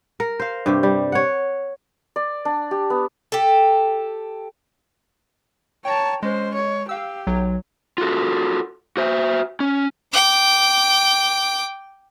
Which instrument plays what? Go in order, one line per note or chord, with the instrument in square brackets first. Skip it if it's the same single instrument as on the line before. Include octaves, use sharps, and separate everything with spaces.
[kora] A#4
C5 F5
G2 C3 G4
G3
C#5 F#5
[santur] D5
D4
G4
B3
[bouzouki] G4 A4
[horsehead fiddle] C#5 A5 [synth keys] G5 A#5
[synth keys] G#3 [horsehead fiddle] C#4 C5
[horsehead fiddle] C#5
[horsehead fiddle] G4 [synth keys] F5 E6
[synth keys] B1 F#3
[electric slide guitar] F4 F#4 A4
F#4 C5 E5
C#4
[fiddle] G5 D6